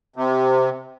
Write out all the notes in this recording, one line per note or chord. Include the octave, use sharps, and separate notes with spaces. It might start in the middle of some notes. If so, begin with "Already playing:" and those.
C3